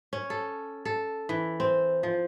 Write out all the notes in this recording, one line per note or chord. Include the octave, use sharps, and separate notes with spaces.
C#4
A4
A4
E3
C4
F3